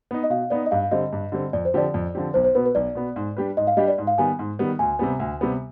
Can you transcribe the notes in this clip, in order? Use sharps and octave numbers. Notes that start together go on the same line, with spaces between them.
B3 D#4
D#5
B2 F5
B3 D#4 D5
D#5
G2 F5
D3 G3 C4 D#5
G2
D3 G3 C4
F2 D5
C5
D3 F3 C4 G4 D5
F2
D3 F3 C4 G4
B1 C5
C5
B2 B3 B4
B4
B1 D5
B2 B3
G#2
G3 D4 G4 B4
G#2 D#5
F5
G3 D4 G4 B4 D#5
D5
G#2
F5
D#3 G3 B3 G#5
G#2
D#3 G3 B3
D2 G#5
C3 G3 B3
D2
C3 G3 B3